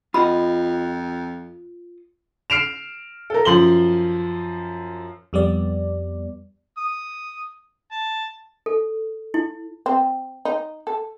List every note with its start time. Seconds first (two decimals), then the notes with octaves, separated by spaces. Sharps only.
0.14 F2 F4 D#5 F#5 B5
2.50 F6 C7 D7 E7 F7
3.30 A4 A#4
3.45 F#2 F3 C6 F#7 G7
5.33 F2 G3 B3 D5
6.77 D#6
7.92 A5
8.66 A4
9.34 E4
9.86 C4
10.45 D#4
10.87 A4